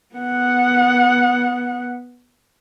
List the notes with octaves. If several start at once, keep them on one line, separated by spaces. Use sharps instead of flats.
B3 F#5